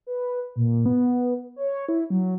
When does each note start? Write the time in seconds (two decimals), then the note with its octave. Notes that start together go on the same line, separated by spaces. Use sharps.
0.07 B4
0.56 A#2
0.86 B3
1.56 C#5
1.89 E4
2.10 F#3